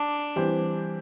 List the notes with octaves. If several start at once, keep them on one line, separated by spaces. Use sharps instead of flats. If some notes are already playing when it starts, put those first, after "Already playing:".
Already playing: D4
E3 G3 C4 G4 C5